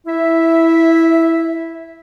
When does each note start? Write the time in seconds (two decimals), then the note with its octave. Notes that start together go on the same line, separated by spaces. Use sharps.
0.07 E4 E5